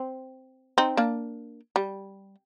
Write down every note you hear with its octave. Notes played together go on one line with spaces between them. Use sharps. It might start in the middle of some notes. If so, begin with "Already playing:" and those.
Already playing: C4
C4 D#4
A#3 D4
G3